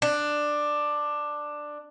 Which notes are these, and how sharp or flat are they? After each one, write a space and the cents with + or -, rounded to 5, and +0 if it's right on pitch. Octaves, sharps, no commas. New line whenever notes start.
D4 +10